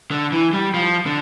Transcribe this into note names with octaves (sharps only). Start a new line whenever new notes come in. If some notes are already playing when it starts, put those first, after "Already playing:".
D3
E3
G3
F3
D3